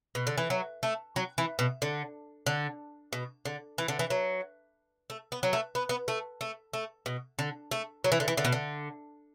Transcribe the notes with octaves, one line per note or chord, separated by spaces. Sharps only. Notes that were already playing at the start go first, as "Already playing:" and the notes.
B2
D3
E3
F#3
A3
F#3
E3
B2
D3
D3
B2
D3
E3
D3
E3
F#3
A3
B3
F#3
A3
B3
B3
A3
A3
A3
B2
D3
A3
F#3
E3
D3
E3
D3
B2
D3